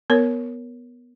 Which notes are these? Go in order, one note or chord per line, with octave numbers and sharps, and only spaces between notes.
B3 A#4 C#5